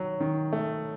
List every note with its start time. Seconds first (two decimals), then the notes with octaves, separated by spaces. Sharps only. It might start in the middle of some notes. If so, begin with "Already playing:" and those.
Already playing: D#3 F#3
0.20 D#3
0.53 A3